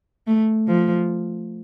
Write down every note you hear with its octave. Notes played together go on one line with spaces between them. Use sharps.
A3
F3